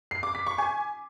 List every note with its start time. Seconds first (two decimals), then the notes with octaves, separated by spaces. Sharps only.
0.11 C7
0.23 D6
0.35 B6
0.47 C#6
0.58 G#5